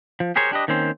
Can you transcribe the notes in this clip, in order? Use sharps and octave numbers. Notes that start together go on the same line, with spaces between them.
F3
G4 G#4 A#4 C5 C#5
D4 G4 B4 D#5
D#3 A#3 C4 C#4 C5